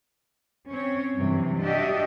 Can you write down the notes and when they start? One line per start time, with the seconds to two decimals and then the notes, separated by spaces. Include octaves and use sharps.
0.71 C4 C#4 C#5
1.16 G2 C3 E3 F#3
1.61 D4 F#4 G4 D#5 E5